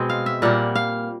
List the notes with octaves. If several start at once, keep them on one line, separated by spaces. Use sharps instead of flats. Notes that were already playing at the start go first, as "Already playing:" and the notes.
Already playing: B2 G#3 C4
F5
E5
A#2 G3 A#3 F#5
F5